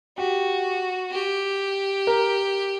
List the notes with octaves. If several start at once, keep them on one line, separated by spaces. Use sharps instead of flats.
F#4 G4
G4
A#4